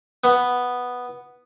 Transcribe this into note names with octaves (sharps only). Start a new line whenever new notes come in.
B3